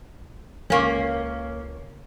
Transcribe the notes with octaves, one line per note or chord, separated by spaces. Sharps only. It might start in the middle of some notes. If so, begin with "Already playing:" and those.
C#2 A#3 C#4